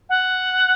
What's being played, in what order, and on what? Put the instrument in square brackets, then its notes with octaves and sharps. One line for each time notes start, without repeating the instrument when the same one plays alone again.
[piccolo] F#5